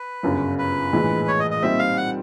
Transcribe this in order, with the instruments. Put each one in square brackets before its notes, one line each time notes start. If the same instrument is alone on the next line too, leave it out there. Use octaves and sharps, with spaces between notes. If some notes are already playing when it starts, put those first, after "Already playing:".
Already playing: [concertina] B4
[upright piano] G1 F#2 C#3
[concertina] B4
[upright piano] A#1 A2 E3 G#3
[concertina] C#5
D#5
D#5
[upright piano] A#2 G3 C4 D#4 [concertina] E5
[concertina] F5
F#5